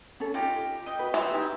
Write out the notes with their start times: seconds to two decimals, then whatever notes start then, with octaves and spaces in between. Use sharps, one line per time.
0.20 C#4 A4
0.34 D#4 F4 G4
0.86 D#5 G5
0.99 F#4 B4
1.14 E3 C5 E5
1.31 D#4 E4 G4